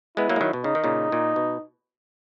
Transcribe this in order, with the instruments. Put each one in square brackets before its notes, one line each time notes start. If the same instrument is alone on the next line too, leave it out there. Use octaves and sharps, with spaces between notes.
[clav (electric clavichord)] G#3 B3 [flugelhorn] E4
[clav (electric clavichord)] F#3 A#3
G#3
D#3 F#3
B2
[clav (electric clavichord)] C#3 [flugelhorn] D#4
[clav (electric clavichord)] D#3
A#2 C#3
A#2
B2